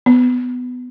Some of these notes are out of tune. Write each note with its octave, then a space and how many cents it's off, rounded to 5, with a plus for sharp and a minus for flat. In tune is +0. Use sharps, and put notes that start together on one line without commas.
B3 +15